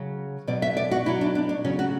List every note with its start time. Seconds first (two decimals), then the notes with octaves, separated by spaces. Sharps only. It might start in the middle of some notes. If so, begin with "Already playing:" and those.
Already playing: C#3 F#3
0.47 B2 F#3 D5
0.62 E5
0.77 D5
0.91 F#4
1.05 B2 F#3 E4
1.21 D4
1.35 D4
1.49 D4
1.64 C#3 F#3 C#4
1.79 F#4